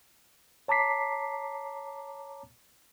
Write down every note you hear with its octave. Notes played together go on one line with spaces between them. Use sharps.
C#5 A5 A#5 D6 B6 C7